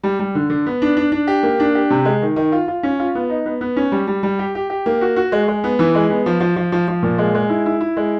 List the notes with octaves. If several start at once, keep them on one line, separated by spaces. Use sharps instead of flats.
G3
G3
D3
D3
B3
D4
D4
D4
G4
A#3
D4
G4
C3
G#3
D#3
D#3
F4
F4
C#4
F4
B3
D#4
B3
B3
C#4
G3
G3
G3
G4
G4
G4
A#3
F#4
F#4
G#3
G#3
B3
E3
G#3
B3
F3
F3
F3
F3
F3
A#2
G#3
G#3
E4
E4
E4
G#3